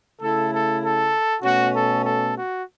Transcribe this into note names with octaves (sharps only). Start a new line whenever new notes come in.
C#3 A3 E4 A4
A4
A4
B2 A3 C#4 F#4
A4
A4
F#4